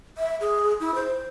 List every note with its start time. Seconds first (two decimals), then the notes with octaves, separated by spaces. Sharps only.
0.17 E5
0.41 G#4
0.80 E4
0.95 C5